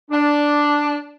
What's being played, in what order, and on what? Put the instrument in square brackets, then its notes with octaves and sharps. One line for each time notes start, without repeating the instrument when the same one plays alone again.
[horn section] D4